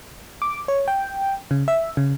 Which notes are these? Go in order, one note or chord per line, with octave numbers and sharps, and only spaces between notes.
D6
C#5
G5
C#3
E5
C#3